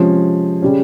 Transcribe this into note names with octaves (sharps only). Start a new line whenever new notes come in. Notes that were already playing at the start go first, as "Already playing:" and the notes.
Already playing: C3 F3 G#3 C#4 G#4
C#3 G3 C#4